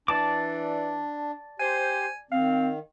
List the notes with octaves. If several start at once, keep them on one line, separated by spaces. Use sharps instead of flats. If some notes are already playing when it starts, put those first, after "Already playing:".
E3 D4 D5 A5 D6
G4 C5 G#5
D#3 C4 F5